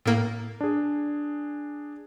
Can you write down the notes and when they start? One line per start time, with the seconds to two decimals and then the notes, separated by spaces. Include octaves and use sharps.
0.05 A2 A#3
0.61 D4 G#4